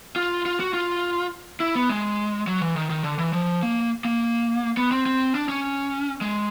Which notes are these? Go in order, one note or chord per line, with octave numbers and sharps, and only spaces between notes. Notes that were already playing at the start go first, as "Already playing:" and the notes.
F4
F4
F#4
F4
E4
B3
G#3
F#3
E3
D#3
D#3
D3
E3
F3
A#3
A#3
B3
C4
C4
D4
C#4
G#3